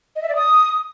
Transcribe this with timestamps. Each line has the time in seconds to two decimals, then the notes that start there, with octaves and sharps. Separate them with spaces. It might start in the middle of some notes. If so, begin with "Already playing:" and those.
0.16 D#5
0.22 E5
0.29 D5
0.36 D#6